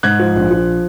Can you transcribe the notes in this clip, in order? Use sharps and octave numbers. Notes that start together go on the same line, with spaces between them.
G#2 F#6 G#6
F3
A#1
F3